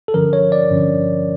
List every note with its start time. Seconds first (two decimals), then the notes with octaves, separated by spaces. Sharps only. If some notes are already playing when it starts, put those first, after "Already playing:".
0.08 A4
0.14 G2 D3 F3 C#4 A#4
0.33 C#5
0.52 D5
0.71 G2 D3 F3 C#4